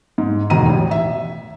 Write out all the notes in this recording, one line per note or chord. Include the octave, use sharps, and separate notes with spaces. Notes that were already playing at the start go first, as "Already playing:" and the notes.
G#2
E1 D#2 B2 A#5 D#7
A1
E5